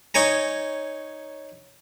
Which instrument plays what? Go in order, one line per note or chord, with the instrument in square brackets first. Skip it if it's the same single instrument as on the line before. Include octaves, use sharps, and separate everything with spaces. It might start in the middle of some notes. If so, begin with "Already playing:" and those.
[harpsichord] D#4 C#5 G#5 A#5